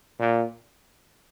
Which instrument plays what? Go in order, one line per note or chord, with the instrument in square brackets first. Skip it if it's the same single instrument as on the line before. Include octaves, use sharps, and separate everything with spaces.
[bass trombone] A#2